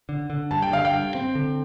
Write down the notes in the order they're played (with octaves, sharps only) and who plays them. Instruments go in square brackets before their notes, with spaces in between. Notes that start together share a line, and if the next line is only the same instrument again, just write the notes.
[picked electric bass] D3
D3
[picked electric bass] G2 [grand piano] A5
[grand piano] G5
[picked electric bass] D3 [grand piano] F5
[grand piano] G5
[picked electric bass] G2
C4
D3